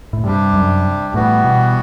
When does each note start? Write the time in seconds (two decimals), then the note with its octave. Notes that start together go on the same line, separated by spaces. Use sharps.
0.13 A2
0.24 G2 C3 G3 D4 G4
0.54 F#2
1.14 A2 E3 G3 B3 F#4
1.44 B2